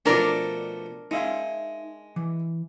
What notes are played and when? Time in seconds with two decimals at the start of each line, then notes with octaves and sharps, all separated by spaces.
0.06 B2 F3 A3 D4 A#4 D5
1.11 G#3 D#4 E5 F5
2.16 E3